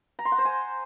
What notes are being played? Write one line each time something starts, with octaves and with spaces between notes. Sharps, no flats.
A#5
C6
F#5
C5
G#5